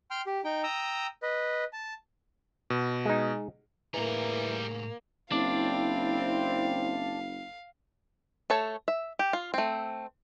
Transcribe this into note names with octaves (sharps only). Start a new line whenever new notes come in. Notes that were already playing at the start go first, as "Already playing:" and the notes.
G5 C6 F6
G4
D#4 G5
G5 A#5 D#6 E6
B4 D#5
A5
B2
G#3 D#4
A2 E3 G3 A#3 G#4 A#5
F#1 C4 D4 E4 D5 F5
A3 A4 C#5 A5
E5
G4
F4
A3 C4